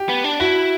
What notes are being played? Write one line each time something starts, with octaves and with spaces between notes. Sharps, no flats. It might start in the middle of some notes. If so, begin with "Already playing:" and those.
Already playing: G4
B3
D4
E4 F#4